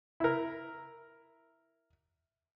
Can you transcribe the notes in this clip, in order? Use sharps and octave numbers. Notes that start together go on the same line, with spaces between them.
E4 A#4